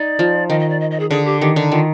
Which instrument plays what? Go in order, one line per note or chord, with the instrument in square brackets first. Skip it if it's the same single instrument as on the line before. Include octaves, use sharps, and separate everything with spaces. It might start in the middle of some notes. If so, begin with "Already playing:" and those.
Already playing: [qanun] D#4 [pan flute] D5
[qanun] F3
[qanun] D#3 [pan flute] D#5
[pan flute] D#5
D5
D#5
D#5
G#4
[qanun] D3 [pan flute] G#4
[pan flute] G4
[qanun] D#3 [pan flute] G4
[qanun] D3 [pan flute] D#4
[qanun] D#3 [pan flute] F4